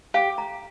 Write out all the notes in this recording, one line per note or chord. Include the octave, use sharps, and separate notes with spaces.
G4 F5
A#5